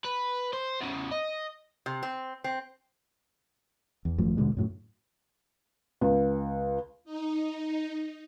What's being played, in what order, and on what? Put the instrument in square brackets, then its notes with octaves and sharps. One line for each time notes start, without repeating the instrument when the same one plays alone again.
[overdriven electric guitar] B4
C5
E2 C#3
D#5
[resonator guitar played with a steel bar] C3
C4
C4
[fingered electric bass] E2
G#1 F#2 F3 A3
D#1 B2 D3 G#3
F#2 A2 F#3
[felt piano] C#2
[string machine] D#4